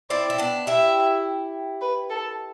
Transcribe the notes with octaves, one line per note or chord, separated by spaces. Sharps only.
C4 E4 D5
E4
B3 D4
E4 G4 E5
B4
A4